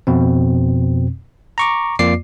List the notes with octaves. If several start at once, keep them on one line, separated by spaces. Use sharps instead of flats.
F2 B2 C4
A#5 C#6 D6
F2 A#3 F4 D5 D6 C7